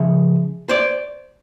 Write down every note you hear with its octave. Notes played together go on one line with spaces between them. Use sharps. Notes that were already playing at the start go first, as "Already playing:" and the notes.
Already playing: C#3 F3 G#3 C#4 E5
C5 D5